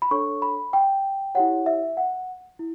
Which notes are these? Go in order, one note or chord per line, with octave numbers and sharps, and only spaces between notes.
B5
D4 A4 C#5 C#6
B5
G5
E4 G4 C#5 F#5
E5
F#5
E4